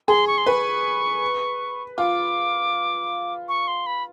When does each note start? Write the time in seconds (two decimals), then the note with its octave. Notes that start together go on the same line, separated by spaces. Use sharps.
0.08 G#4 C6
0.27 C#6
0.38 C6
0.46 B4 C#6
1.98 F4 D6
3.49 C#6
3.68 C6
3.86 B5